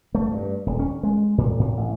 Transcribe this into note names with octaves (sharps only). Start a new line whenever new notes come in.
A3
G2
D#1
C#4
G#3
A2
A2
A1